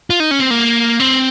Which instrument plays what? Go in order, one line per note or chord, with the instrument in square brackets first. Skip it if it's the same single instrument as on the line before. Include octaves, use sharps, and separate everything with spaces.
[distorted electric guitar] F4
D#4
C#4
C4
A#3
C4